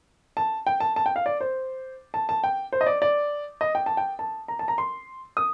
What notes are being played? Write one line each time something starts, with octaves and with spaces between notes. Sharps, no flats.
A5
G5
A5
A5
G5
F5
D5
C5
A5
A5
G5
C5
D#5
D5
D5
D#5
G5
A5
G5
A5
A#5
A5
A#5
C6
D#6